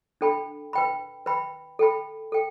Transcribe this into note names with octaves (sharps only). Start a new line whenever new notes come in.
D4 A4 G5 B5
B4 G5 B5
B4 G5 B5
A4 G5 B5
A4 G5